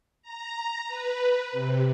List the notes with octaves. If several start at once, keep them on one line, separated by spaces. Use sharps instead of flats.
A#5
B4
C3